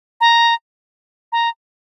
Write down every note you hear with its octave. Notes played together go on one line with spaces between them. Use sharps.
A#5
A#5